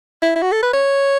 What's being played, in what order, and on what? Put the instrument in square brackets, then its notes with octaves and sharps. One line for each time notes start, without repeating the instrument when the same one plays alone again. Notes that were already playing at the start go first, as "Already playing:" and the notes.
[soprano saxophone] E4
E4
F#4
A4
B4
C#5